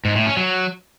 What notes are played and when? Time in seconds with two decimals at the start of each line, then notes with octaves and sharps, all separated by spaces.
0.05 G#2
0.15 A2
0.26 C#4
0.37 F#3